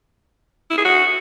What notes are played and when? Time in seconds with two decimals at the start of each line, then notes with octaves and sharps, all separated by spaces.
0.71 E4
0.78 G#4
0.85 F#4